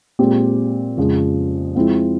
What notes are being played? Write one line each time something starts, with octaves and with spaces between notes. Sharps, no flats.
A#2 G#3 C4 G4
F2 C#3 F3 G#3
F3 G#3 C4 E4